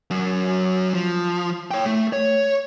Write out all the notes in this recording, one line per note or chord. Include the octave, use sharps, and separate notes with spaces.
F#2 F#3
F3
C#5 G5
A3
C#5